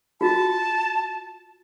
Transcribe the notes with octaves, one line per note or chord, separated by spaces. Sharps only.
F4 F#4 A5